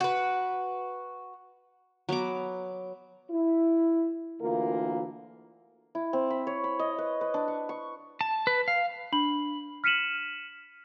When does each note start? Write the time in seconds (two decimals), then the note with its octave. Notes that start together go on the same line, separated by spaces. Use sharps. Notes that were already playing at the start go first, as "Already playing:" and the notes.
0.01 F#4 B4
2.09 F#3 B3 A#5 D6
3.30 E4
4.42 D2 E3 A#3 F4 A#4
5.95 E4
6.13 C4
6.30 B5
6.47 C#5
6.64 B5
6.79 D#5
6.98 B4
7.21 B4
7.34 D4
7.48 C#6
7.69 C#6
8.21 A5
8.47 B4
8.68 F5
9.12 D4 B5 F#7
9.84 F6 B6 C#7 D#7 E7 F#7